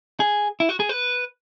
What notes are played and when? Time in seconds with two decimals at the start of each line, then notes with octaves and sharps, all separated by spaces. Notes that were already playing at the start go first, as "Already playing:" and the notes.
0.20 G#4
0.60 E4
0.69 F#4
0.80 G#4
0.89 B4